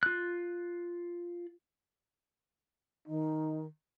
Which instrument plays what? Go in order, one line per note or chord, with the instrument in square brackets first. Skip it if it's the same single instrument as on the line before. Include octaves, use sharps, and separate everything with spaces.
[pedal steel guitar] F4 F#6
[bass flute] D#3 [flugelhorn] D#4